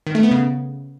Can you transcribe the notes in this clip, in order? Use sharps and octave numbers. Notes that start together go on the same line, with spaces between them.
D#3
A3
B3
C#3